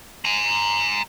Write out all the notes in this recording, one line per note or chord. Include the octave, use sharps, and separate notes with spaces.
G#5 A#5